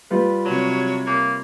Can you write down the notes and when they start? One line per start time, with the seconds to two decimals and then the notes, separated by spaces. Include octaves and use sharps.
0.10 G3 F4 B4
0.45 C3 F#3 C#5
1.07 A#3